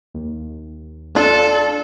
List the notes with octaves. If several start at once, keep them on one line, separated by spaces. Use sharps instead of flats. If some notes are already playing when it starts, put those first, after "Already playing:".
D#2
D4 F4 A4